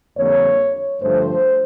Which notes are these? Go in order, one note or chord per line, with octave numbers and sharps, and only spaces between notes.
F2 D3 G3 A#3 C#5
G2 D3 F3 A3 C5